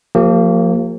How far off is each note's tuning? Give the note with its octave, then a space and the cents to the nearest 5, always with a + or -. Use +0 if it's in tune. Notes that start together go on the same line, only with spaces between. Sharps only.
F3 +20 A#3 -30 G4 +20